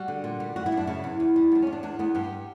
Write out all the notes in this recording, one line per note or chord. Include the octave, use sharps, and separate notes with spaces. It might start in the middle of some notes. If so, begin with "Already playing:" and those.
Already playing: G3 F#4
D3
A#2
G3
F#2 F#4
E4
F#2
D4
C#3 E4
E2
E2
G3
E2 D4
E2 C#4
D4
E2 D4
E2 B3
G2 G4